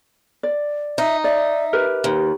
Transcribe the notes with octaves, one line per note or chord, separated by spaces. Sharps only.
D5
D#4 E5
D5 E5
G4 A#4 B4
D#2